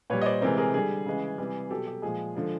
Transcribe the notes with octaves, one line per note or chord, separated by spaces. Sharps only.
A#2 G3 B4 C#5
D#5
C5 D5
C3 E3 G#3 A#4 C5
G#4 A#4
D3 G3 G#4
C#3 E3 G#3
C3 E3 G3
B2 F#3 G4 A4
G4
A#2 F3 G#3 G#4
D3 F3 G#3